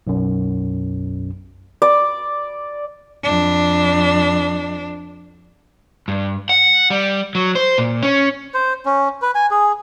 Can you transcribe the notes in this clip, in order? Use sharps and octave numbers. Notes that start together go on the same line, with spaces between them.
B1 F#2
D5
F2 D4
G2
F#5
G3
F#3
C5
A#2
C#4
C5
C#4
B4
G#5
G#4